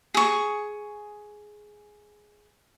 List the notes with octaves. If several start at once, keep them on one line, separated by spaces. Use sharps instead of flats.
G#4 C#6